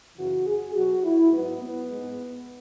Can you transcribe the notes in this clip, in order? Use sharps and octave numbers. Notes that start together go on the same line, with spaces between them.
F#2 C#3 E3 F#4
G#4
B2 F#3 F#4
E4
G#2 F#3 B3
B3
G#2 G#3